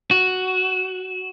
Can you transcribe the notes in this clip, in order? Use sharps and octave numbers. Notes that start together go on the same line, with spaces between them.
F#4